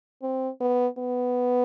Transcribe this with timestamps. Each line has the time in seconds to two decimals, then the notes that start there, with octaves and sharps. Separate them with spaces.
0.23 C4
0.61 B3
0.98 B3